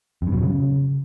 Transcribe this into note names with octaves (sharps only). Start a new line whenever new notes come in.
F2
G2
B2
F#3
C#3